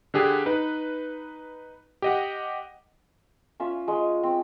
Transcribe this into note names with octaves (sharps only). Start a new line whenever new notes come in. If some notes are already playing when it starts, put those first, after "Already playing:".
D3 D4 G4 G#4
D#4 B4
G4 D#5 F#5
C#4 F4 E5
G#3 D#6
C4